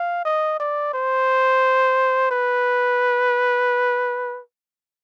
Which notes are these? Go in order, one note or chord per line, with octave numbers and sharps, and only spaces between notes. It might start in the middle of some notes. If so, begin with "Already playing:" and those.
Already playing: F5
D#5
D5
C5
B4